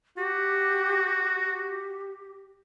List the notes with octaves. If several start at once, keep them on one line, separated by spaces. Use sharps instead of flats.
F#4 G4
G4